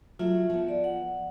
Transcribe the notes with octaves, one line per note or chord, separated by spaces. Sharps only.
F#3 A3 F4 E5
F3 B3
D5
F#5